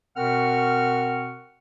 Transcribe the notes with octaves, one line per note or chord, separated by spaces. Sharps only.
B2 C4 A#4 F#5 C#6 F6